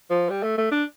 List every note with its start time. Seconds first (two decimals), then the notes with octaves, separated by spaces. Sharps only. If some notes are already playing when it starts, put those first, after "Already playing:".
0.10 F3
0.30 G3
0.43 A3
0.58 A3
0.71 D4